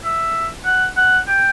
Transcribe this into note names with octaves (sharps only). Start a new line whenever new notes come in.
E5
F#5
F#5
G5